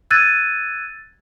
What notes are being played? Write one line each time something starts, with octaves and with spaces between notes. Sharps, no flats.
E6 F#6 G#6 A6 D#7